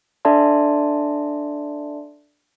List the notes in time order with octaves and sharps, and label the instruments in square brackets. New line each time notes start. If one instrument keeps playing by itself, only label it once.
[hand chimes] D4 A4 D5 E5 A5 C6